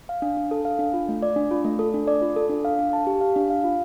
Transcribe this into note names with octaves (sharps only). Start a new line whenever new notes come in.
F5
D4
D4
A4
F5
D4
F4
A3
D5
D4
F4
A3
A4
D4
D5
F4
A4
D4
F5
D4
A5
G4
F5
D4
F5
F4